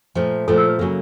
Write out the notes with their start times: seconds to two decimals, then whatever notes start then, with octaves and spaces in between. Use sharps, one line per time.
0.15 A#2 F3 A3
0.48 A#2 F3 A3 A4
0.58 A#4
0.69 B4
0.79 C#3 F#3 A#3